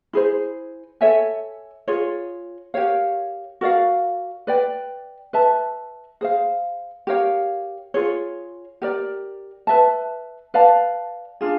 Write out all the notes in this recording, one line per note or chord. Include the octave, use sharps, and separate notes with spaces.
E4 G#4 C5
A4 C#5 E5 G#5
F4 G#4 C#5
G4 A#4 C#5 F5
F#4 A#4 D5 F5
B4 D5 G5
B4 E5 A5
G#4 C5 F5
G4 A#4 C#5 F5
F4 G#4 C#5
G4 A#4 D5
B4 E5 A5
B4 D5 F5 A5
D4 F4 G#4